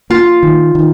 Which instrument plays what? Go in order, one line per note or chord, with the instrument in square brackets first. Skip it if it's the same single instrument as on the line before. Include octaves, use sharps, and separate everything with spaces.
[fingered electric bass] A#3 [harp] F4
[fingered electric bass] D#3
D#3